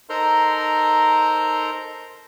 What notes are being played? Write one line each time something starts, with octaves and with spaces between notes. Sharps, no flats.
D#4 A4 A#4 C5 A#5 C6